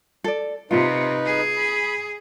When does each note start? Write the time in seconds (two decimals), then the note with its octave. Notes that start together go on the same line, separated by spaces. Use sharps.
0.24 A4 D5
0.71 C3 D#4 F4 B4
1.26 G#4
1.57 B5